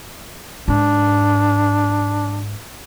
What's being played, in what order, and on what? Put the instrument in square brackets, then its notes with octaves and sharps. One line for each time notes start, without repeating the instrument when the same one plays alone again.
[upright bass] G#2 [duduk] D4